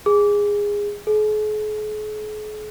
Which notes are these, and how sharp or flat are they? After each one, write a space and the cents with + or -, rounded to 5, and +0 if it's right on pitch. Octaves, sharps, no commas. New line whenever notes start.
G#4 -15
G#4 +45